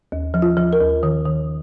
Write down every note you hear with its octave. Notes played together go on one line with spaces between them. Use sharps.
D#2
F3
F4
F3
A#4
D#2
D#3
D#3